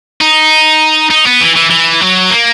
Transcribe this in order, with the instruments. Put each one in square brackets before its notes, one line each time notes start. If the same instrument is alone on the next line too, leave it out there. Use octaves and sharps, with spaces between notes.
[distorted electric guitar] D#4
D#4
B3
E3
E3
E3
F#3
A#3